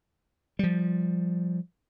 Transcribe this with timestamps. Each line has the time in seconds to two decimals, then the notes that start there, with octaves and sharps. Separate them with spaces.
0.59 F3 G3